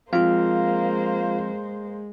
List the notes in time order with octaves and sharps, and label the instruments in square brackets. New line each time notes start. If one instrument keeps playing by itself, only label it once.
[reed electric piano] F3 C4 F6 [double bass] G#3 [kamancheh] A#3 C5 [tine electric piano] F4 F5